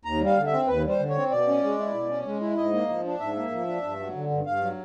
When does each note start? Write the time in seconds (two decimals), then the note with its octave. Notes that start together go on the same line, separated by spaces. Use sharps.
0.05 D#2 A#5
0.21 G3
0.26 F5
0.37 D3
0.46 E5
0.52 C4
0.67 D#2 B4
0.84 G3
0.89 C5
0.99 D3
1.09 C#5
1.15 C4
1.31 B2 D5
1.47 C#4
1.63 G#3
1.78 E4
1.94 B2
2.09 C#4
2.26 G#3
2.41 E4
2.57 G#2 D#5
2.73 A#3
2.89 F3
3.05 D4
3.20 G#2 E5
3.36 A#3
3.52 F3
3.67 D4
3.83 G2
3.99 F#3
4.14 D3
4.31 G2
4.46 G2 F5
4.62 F#3